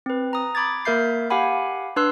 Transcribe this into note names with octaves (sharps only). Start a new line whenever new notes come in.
C4 B4
A#5 D#6
B5 D6 G#6 A6
A#3 A#4 E5 G6 C7
G4 F5 F#5 G#5 B5
D4 B4 C6 E6 F#6